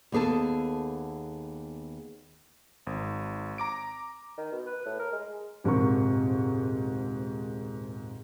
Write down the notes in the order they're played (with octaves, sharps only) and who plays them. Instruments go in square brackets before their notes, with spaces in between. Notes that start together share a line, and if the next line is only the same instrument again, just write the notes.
[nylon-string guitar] D#2 B3 G#4 A4 A5
[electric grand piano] G#1
A#5 D6 D7
[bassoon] D#3
B2
B4
A2
A#4
G#3
[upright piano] D#1 G#2 C3 A#4 C#6